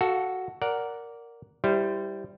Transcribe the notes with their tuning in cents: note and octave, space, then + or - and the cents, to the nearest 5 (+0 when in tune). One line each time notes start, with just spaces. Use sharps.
F#4 +5 A4 -5 F5 +25
A#4 +0 D5 -15 F#5 +0
G3 +0 E4 +0 C5 -25